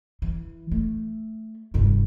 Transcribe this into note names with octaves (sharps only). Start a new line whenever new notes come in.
E3
A3
F1 G2